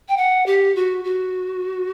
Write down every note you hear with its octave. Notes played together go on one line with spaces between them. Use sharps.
G5
F#5
G4
F#4
F#4